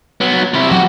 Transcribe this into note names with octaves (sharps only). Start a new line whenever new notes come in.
F#3 B3
C3 E4
F#3 F#4 G4